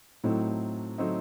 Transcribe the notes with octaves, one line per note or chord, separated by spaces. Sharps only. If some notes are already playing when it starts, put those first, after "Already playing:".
A2 F#3 A3 C4 D#4
F#3 A3 C4 D#4